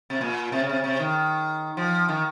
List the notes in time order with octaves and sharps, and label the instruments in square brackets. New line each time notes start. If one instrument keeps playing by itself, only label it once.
[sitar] C3
A#2
C3
C#3
C3
C3
D#3
F3
D#3